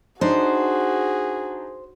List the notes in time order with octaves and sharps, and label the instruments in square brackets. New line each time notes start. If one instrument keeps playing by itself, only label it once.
[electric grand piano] D4 D#4 [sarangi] F#4 [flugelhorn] G#4 [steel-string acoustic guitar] C5